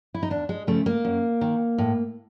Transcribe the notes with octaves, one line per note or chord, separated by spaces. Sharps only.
E4
D#4
E2 D4
G#3
C#3 F3 A3
A#3
F#2
D#3
A2